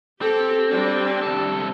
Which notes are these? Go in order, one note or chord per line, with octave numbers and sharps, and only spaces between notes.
C4 G4 A4
G3 D4
C2 A4